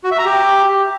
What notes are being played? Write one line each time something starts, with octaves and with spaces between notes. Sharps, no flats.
F#4
E5
A#5
G4